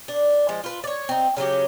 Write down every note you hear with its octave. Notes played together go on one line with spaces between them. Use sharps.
D4
F3 G#3
F4 B4
C#5 D5
C4 D#4
C#3 F#3 C#4 G4